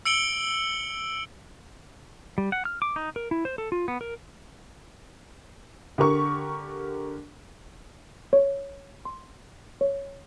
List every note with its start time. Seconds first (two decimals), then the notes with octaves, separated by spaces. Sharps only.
0.05 E6 C#7 D7 F#7 G7
2.38 G3
2.52 F#5
2.65 F6
2.82 D6
2.96 D#4
3.16 A#4
3.31 E4
3.45 C5
3.58 A4
3.72 F4
3.88 B3
4.01 A#4
5.98 D3 G4 A#4 C#6
8.33 C#5
9.05 C6
9.81 C#5